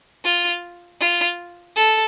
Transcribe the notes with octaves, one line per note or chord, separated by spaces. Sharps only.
F4
F4
A4